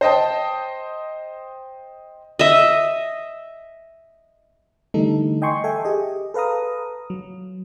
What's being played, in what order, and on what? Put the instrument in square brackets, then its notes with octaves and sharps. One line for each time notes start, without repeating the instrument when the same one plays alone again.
[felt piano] C5 D#5 G5 A5
[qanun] D#5 E5
[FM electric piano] D3 E3 G3 A3 D#4 A4
D#5 G5 G#5 C6 C#6
A4 E5 G5 G#5
G4 G#4 D#5
A4 B4 F5 A#5 D#6
F#3